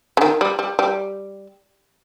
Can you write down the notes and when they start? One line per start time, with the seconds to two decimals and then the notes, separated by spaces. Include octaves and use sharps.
0.17 C#3
0.21 D#3
0.41 G3
0.59 G3
0.79 G3